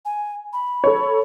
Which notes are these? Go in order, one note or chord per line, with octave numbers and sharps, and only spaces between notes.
G#5
B5
A4 C#5